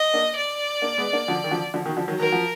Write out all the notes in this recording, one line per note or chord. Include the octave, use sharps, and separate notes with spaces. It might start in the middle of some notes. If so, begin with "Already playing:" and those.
Already playing: D#5
A#3 D4
D5
A#3 D4
G#3 B3
A#3 D4
D3 F3
D#3
D3 F3
D3 F3
B2 D#3
D3 F3
D#3 F#3
D#3 F#3 A#4
F3